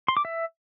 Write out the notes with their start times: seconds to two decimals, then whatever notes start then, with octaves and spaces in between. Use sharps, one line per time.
0.08 C6
0.17 D6
0.25 E5